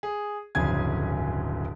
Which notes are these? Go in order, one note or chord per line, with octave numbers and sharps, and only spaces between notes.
G#4
D1 G1 F2 C#3 G#5 G#6